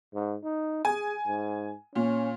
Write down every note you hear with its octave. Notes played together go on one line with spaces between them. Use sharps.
G#2
D#4
G#4 G#5
G#2
A#2 C#4